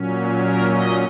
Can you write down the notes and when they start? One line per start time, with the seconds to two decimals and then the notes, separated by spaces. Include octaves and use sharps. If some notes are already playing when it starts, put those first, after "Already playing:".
Already playing: A#2 F#3 C#4
0.40 A#4
0.70 D#5